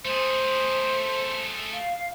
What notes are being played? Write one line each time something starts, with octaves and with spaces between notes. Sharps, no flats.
A3 G#4 C5
F5